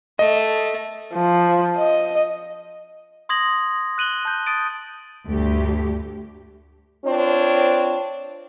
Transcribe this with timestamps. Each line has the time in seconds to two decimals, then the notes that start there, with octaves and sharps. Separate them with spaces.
0.19 A3 D#5
1.14 F3
1.78 D#5
3.29 C6 D#6 G#6 A#6 F#7
3.98 F#6 D#7 F#7 G7
4.25 A5 G6
4.46 D#6 A6 D7 D#7
5.26 D2 G2 A3 G4
7.05 C4 D4 F4 C#5